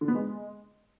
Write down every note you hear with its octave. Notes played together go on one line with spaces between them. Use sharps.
D3
B3
G#3